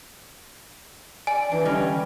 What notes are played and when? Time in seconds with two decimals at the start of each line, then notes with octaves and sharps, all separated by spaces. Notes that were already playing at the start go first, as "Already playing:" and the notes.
1.27 D5 G#5
1.52 E3 D4
1.65 D3 G3 C#4 D#5